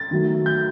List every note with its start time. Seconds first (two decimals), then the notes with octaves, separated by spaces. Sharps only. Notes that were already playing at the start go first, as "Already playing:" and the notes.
Already playing: A6
0.11 D#3 F#3 A3
0.46 G6